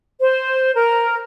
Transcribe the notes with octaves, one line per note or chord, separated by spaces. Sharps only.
C5
A#4